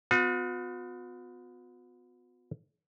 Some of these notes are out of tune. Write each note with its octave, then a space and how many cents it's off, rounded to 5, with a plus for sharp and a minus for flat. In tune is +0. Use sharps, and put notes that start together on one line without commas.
B3 +30 F#4 -45